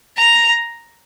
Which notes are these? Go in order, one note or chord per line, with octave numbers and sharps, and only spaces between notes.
A#5